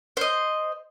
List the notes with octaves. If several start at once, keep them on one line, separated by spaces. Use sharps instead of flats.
C5 D#5